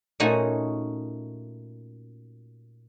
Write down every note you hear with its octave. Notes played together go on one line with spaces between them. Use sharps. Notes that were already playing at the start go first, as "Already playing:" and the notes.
A#2 A3 C#4 D#4 F#4 G#5